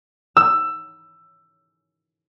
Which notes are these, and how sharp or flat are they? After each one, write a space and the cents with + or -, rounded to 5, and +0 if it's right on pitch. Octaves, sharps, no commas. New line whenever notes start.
E6 +15